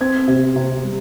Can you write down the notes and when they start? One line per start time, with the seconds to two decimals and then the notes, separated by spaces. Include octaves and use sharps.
0.01 C4 G#6
0.28 C3
0.56 C3
0.84 G3